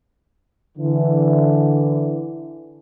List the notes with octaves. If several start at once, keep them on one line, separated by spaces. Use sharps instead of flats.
D3 E3